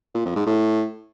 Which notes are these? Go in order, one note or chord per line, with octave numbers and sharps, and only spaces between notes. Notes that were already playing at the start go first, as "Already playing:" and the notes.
A#2
F2
G#2
A2